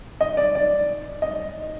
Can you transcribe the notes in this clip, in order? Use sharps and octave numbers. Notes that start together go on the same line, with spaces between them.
D#5
D5
D5
D#5